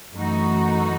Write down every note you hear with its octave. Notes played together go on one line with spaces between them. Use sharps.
F#2 E3 A3 D#4 F#4